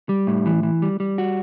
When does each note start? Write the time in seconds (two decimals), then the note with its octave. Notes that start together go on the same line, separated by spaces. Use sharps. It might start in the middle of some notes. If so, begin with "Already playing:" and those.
0.09 G3
0.27 A2
0.46 E3
0.63 E3
0.82 G3
1.00 G3
1.18 F#4